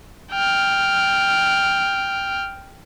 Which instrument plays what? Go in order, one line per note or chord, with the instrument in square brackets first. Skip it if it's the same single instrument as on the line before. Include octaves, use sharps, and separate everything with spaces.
[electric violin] G5 F6